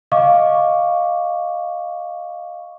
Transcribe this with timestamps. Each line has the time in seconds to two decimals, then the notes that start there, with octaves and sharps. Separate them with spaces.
0.12 D#5 F5 C#6 D6